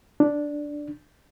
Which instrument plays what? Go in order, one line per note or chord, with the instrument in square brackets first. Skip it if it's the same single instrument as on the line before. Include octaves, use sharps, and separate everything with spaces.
[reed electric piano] D4